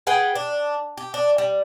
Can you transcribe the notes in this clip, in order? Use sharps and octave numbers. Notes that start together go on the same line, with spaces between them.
G#4 B4 F#5 G5
D4
G4
D4
G3